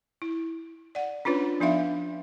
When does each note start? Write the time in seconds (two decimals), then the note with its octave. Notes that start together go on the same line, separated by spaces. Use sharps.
0.22 E4
0.95 D5 F#5
1.25 C#4 D4 F4 B4 C#5
1.60 F3 B3 D4 D#4 E5 F5